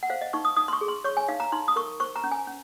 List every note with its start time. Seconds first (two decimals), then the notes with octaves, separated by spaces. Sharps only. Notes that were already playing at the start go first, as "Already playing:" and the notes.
0.03 F#5
0.10 C5 F5
0.21 D#5
0.33 D#4 C#6
0.45 D#6
0.57 D#4 D#6
0.68 C6
0.73 C#6
0.81 G#4
0.88 C6
1.04 C#5 C#6
1.17 G#5
1.28 D#4 F5
1.40 A#5
1.52 D#4 C6
1.68 D#6
1.76 A#4 C#6
2.00 C5 C#6
2.16 A#5
2.24 C#4
2.32 G#5
2.47 C#4